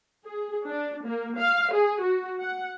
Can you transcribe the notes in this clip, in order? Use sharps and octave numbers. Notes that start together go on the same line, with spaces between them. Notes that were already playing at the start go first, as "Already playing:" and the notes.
G#4
D4
A#3
F5
G#4
F#4
F#5